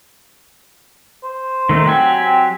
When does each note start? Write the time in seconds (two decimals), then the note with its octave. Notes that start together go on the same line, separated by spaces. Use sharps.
1.23 C5
1.69 D#3 A3 D#4
1.86 F#3 C4 G4 G#5
2.22 C4